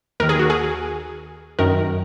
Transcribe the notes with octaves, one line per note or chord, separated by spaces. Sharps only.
D#2 D#3 A#4
G#4
F#4
G#4
F#2 D#3 A#4